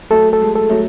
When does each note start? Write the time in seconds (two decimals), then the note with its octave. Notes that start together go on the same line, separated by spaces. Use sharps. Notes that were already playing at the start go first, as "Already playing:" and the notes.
0.10 F#3 A3 A4
0.33 A4
0.41 G#3
0.55 A4
0.69 F#3 A3